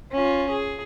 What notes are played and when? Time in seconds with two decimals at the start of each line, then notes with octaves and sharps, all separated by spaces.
0.12 C#4 F4
0.50 G#4